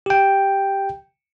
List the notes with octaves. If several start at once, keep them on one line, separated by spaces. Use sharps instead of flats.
G4 G5